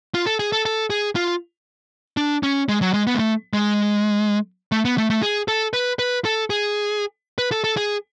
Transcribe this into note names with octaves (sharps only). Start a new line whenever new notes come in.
F4
A4
G#4
A4
A4
G#4
F4
D4
C#4
G#3
F#3
G#3
B3
G#3
A3
G#3
A3
B3
A3
A3
G#4
A4
B4
B4
A4
G#4
B4
A4
A4
G#4